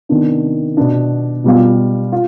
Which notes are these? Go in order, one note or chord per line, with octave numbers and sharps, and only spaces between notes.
C3 D#3 B3 D4
B2 B3 D4
B2 G3 B3 F4
F4